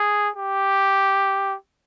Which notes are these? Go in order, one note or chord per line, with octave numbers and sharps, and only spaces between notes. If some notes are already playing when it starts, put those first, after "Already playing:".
Already playing: G#4
G4